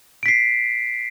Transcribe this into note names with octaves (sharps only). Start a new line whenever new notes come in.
B6 C7 D7